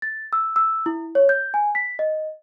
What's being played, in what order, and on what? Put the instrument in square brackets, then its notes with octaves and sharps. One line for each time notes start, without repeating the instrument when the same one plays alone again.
[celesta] A6
E6
E6
E4
C#5
G6
G#5
B6
D#5